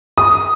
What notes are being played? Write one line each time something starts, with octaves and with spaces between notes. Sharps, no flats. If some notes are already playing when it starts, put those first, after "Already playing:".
D#6